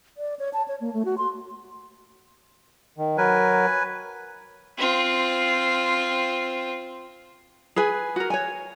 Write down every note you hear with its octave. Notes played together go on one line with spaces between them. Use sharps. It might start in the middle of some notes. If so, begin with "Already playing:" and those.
D5
C#5
A5
C#5
A#3
A3
F#4
C6
D#3
F#3 A#4 B4 G#5
C4 F4
G#4 B4 G#5
F#4 A#4
C#5 G#5